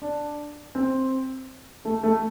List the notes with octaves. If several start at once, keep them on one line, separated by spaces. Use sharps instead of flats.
D4
C4
A3
A3